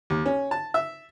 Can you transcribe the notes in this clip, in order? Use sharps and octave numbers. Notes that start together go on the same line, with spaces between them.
D#2
C#4
A5
E5